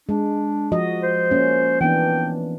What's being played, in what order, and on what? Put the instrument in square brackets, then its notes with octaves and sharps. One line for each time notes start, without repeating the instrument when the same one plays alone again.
[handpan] G#3 [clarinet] D4
[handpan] F3 F#4 D#5
[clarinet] C5
[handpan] A#3 C#4
[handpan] E3 B3 D4 [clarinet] G5